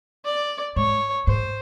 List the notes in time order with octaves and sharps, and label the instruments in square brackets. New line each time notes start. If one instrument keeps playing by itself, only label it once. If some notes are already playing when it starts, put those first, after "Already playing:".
[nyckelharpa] D5
[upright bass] G#2 [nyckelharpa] C#5
[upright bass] G#2 [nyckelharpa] C5